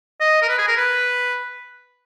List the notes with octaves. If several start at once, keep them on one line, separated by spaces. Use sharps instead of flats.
D#5
A#4
B4
G#4
A#4
B4